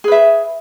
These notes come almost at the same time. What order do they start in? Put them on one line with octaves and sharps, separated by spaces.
G#4 B4 E5